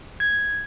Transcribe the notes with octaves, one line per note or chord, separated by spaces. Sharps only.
G#6